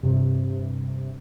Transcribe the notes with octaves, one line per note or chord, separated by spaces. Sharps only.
G2 C3